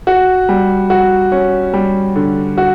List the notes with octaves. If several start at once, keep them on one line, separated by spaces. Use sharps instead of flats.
F#4
G3
F#4
C#4
G3
D3
F#4